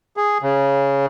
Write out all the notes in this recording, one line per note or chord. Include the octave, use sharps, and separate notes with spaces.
G#4
C#3